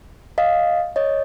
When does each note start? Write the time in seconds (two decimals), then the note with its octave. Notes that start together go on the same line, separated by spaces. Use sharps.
0.38 D#5 F5
0.96 C#5 D#5